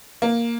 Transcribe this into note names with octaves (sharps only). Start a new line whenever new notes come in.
A#3